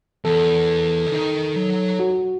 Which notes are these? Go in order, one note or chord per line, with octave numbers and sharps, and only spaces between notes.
E2 A4
C#3
D#3 D#4
F#3
F#4